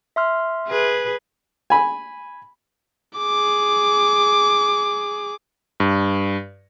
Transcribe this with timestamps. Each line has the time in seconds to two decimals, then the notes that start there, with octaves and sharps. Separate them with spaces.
0.16 E5 C6 F6
0.67 G#4 B4
1.70 G#5 B5
3.17 G#4 D6
5.80 G2